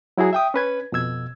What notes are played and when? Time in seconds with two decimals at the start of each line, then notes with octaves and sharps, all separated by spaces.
0.18 F#3 E4 F#4 G#4
0.33 E5 G5 D#6
0.54 C#4 B4 G#6
0.92 F2 B2 E6 G#6